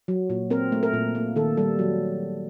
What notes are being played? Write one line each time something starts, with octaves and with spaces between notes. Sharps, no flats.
F#3
A#2
C4 A#4
A3
A#4
A#2
A#3
D#3 A4
G3 A4
F#3